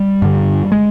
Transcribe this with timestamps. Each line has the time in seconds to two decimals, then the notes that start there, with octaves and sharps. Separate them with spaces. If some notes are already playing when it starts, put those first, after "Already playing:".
Already playing: G3
0.22 G2 D3
0.72 G#3